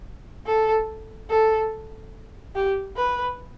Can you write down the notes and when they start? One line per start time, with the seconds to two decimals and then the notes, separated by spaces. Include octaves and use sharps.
0.46 A4
1.30 A4
2.55 G4
2.96 B4